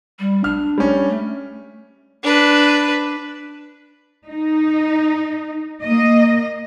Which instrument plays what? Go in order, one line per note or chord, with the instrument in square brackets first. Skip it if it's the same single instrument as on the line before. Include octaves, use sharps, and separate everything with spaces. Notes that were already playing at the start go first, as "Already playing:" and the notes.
[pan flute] G3
[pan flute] D4 [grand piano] F6
[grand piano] G3 C#4
[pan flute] A3
[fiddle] D4 B4
[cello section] D#4
A#3 D#5